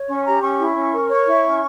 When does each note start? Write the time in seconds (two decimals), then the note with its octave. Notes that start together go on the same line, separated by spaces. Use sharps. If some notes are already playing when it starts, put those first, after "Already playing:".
Already playing: C#5
0.08 C#4 C#6
0.25 G4 A#5
0.42 C#4 C#6
0.59 E4
0.75 C#4
0.93 A#4
1.10 C#5 C#6
1.27 E4
1.43 C#4